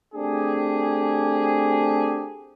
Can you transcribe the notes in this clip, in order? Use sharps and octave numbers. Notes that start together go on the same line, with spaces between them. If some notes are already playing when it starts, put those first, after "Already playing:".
A3 C4 D4 G4 G#4